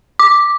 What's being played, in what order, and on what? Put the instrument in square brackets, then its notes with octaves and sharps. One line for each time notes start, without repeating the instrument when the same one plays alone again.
[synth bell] D6